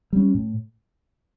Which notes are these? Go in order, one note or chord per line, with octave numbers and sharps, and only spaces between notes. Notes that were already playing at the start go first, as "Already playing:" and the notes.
G3 C#4
A2